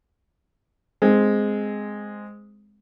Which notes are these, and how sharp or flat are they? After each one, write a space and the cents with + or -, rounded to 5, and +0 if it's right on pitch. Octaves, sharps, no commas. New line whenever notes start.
G#3 +0 C4 -10